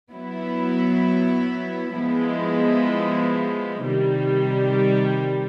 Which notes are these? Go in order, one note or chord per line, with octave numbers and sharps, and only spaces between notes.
F#3 B3 E4
F3 G#3 B3 E4
C3 D#3 G3